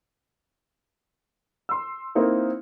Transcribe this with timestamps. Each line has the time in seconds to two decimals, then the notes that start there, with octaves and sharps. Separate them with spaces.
1.69 C6 E6
2.15 A#3 C4 D#4 E4 A#4